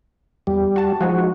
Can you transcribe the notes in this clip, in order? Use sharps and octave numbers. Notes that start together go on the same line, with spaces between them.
E2 G3
F#4 A5
F3 G#3 D#4 F#4